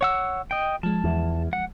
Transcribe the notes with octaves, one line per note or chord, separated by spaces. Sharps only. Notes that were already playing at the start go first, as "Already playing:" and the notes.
C#5 F#5 E6
D#5 G5
F3 G#3 A5
E2
F#5